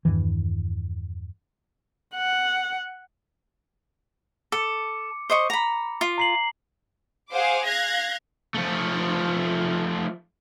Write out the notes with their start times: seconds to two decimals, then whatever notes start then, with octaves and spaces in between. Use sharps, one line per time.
0.05 E2 G2 D#3 E3
2.15 F#5
4.52 A4 D6 C#7
5.30 C5 D#5 C#6
5.50 A#5 B5
6.01 F4
6.18 A#5 C7 F#7
7.30 G#4 C5 F5 F#5 D6
7.65 F5 F#6 G#6 A#6
8.55 F3 A3